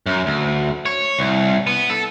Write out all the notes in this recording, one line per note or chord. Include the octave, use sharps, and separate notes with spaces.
F#2
D2
C#5
C2
B3
A4